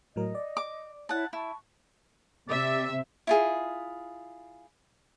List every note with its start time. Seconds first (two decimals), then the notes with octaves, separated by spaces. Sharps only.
0.16 A2 F#3 A#4 D#5
0.35 D5
0.57 D6
1.09 E4 C#5 F#5 A5
1.33 E4 A5 C#6
2.49 C3 D5 E5
3.27 E4 F4 G#4